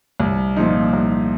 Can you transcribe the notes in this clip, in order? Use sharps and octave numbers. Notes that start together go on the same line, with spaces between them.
C2
A#2 F3 D#4
C2